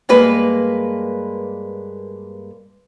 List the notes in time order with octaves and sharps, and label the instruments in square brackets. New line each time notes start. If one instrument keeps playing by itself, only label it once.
[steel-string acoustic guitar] G2 G#3 A#3 B4